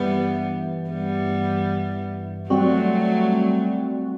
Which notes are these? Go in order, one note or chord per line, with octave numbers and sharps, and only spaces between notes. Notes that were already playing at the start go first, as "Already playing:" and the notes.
Already playing: G2 E3 G3 B3
G3 B3
F#3 G3 A3 C4 F#4